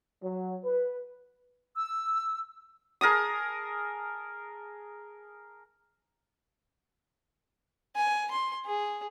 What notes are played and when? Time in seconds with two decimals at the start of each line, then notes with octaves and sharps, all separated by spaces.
0.22 F#3
0.64 B4
1.76 E6
3.01 G#4 A#4 A5 D#6
7.95 G#5
8.31 C6
8.66 G#4